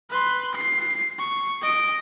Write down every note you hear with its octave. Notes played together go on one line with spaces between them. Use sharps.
B4 C6
C7
C#6
D#5 D7